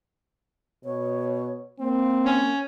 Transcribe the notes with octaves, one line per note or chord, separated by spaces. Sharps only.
B2 C#5
A#3 C4
C#4